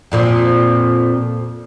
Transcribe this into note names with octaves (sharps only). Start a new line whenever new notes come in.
F2 A#2 F3